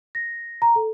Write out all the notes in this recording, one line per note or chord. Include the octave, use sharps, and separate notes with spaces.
A#6
A#5
A4